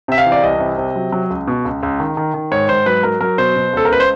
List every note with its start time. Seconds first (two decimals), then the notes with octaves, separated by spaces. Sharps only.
0.08 C3 E5
0.18 F5
0.26 E3
0.32 D5
0.43 C2 D#5
0.60 C3
0.78 C3
0.96 F#3
1.12 F#3
1.30 C#2
1.47 B2
1.65 C#2
1.83 C#2
2.00 D#3
2.17 D#3
2.34 D#3
2.51 G#2 C#5
2.69 G#2 C5
2.86 F#3 B4
3.03 F#3 A#4
3.21 F#3 A#4
3.38 B2 C5
3.56 B2
3.73 C#2 A4
3.85 A#4
3.90 C#2 B4
4.00 C5